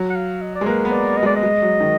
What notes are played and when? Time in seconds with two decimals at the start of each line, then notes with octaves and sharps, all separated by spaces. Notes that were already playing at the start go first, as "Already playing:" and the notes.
Already playing: F#3
0.10 F#5
0.16 F5
0.42 D#5
0.55 D5
0.61 G#3
0.66 A#3 B4
0.85 B3
0.92 D5
1.17 D#5
1.23 G#3 D5
1.36 D#5
1.43 G#3
1.62 F#3
1.80 D#3